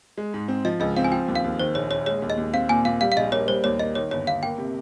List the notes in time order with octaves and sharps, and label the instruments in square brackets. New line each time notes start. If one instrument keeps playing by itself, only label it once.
[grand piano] G#3
G#2
C4
[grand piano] F3 [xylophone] D#5
[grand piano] C#2 [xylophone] D#5
[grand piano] C4 [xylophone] F5
[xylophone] G#5
[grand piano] F3 [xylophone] G5
[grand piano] D#2
[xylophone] F5
[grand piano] D#2
[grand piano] D#3 [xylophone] C5
[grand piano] A#1 [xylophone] C#5
[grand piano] A#1 [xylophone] C#5
[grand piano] G#3 [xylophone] C#5
[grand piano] D#2
[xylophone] D#5
[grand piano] D#2
[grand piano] C4 [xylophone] F5
[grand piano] A#2 [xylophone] G#5
[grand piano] A#2 [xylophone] F5
[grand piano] G3 [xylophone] F5
[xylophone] F5
[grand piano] A#1 [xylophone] D#5
[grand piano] A#3 [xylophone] C#5
[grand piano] G3 [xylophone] C5
[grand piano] D#2 [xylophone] C#5
[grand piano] A#3 [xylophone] D#5
[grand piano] D#3 [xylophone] C#5
[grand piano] G1 [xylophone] C#5
[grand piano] G1 [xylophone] F5
[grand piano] A#3 [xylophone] G5
[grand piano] C3